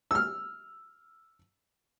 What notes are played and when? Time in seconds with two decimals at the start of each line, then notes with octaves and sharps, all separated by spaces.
0.11 E6 F6